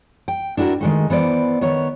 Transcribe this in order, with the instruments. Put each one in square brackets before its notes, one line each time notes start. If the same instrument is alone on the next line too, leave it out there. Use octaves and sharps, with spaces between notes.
[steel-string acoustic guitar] G5
D4 E4 F#4 G#4 A#4
D#3 G#3 A3
E3 B3 C5 D5
D#3 B3 C#5